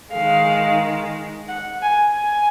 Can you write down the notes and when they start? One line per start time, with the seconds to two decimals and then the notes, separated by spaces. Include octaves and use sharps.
0.12 D#3 G#3 F5
1.48 F#5
1.82 G#5
2.16 G#5